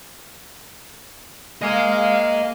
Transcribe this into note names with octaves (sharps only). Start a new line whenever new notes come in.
A#3 D#5 F5 G#5